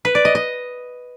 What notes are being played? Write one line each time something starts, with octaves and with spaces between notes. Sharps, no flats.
B4
D5
D#5
D#5